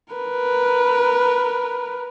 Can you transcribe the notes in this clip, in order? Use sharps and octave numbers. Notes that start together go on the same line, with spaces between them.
A#4 B4